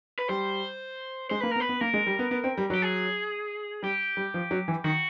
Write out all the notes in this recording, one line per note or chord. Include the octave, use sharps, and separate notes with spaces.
B4
G3 C5
G#3 C5
A#3 B4
A#4
B3
B4
B3
A#3 A#4
G#3
G3
B3
B3
C4
G3
F#3 G4
G#4
G3 G4
G3
F3
F#3
E3
D#3 F#4